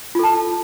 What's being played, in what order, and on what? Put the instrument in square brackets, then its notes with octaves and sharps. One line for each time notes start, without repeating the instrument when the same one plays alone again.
[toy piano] F4
A4
A5